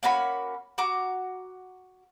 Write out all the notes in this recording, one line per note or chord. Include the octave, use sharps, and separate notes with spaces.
A#3 C#4 F#4 B5
F#4 A#5 D6